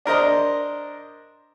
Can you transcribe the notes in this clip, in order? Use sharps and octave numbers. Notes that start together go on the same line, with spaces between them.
D4 A#4 C5 D#5